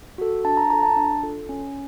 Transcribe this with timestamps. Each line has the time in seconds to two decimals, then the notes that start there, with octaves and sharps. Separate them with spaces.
0.18 F#4 A4
0.45 D4 A5
0.57 A#5
0.70 F4 A#5
0.73 A4
0.83 A5
0.96 D4
1.23 F4 A4
1.49 C#4